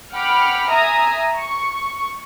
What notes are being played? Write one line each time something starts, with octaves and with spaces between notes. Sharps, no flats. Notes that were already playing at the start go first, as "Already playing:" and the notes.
F#5 G5 B5 D6 F6
E5 G#5 A#5 D#6
C#6